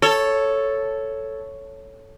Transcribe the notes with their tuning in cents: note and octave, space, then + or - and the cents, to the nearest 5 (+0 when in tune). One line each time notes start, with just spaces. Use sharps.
A4 +0 C#5 +0